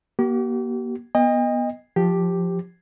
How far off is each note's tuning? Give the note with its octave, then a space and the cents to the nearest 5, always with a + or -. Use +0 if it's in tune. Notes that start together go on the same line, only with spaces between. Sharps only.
A#3 +35 G4 -40
B3 -15 D#5 +0 G5 +45
F3 +5 G4 +0